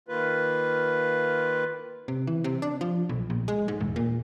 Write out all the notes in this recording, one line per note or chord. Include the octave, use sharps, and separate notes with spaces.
D#3 A#3 F4 B4
C3
E3
C3
D4
F3
B1
A#1
G#3
G#2
E1
A#2